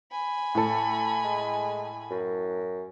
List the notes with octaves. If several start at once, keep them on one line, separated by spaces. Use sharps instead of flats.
G#5 B5
A2 A4
G#3
F#2